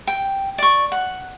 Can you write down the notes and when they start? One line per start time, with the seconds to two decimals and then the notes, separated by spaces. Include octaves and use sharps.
0.07 G5
0.58 D5 C#6
0.92 F#5